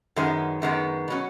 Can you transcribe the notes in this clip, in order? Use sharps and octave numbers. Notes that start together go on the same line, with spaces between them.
F#2 D#3 G#3 B3
F#2 D#3 G#3 B3
B2 F#3 C#4